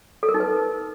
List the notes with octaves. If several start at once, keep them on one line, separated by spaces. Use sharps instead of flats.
A4
A#4
D#4
B4